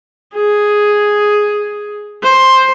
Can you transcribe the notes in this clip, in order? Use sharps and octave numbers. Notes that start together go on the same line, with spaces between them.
G#4
C5